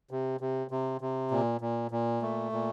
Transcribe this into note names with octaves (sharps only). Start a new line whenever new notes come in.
C3
C3
C3
C3
A#2
A#2
A#2
A3
A#2